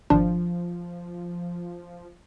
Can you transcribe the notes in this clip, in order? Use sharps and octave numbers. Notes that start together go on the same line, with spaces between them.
G#1 F3 D4